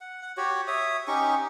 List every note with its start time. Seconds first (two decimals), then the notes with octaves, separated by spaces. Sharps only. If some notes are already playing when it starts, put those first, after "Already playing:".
0.01 F#5
0.22 F#5
0.37 F#4 G4 C#5
0.67 C#5 E5 D#6
1.08 C#4 D#4 G4 C#6